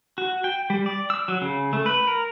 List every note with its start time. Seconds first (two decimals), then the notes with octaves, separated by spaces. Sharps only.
0.18 F#4
0.44 G5
0.70 G3
0.86 D5
1.10 E6
1.28 F#3
1.41 C#3
1.73 A3
1.86 B4
2.07 A#4